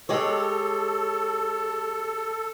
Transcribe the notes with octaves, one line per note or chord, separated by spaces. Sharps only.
G#3 G4 A4 C#5